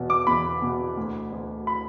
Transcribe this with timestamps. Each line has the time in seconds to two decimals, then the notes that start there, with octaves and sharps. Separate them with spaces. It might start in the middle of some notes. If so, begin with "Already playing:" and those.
Already playing: E2 B2
0.10 D6
0.27 E2 B5
0.62 B2
0.97 D2
1.32 D2
1.67 B5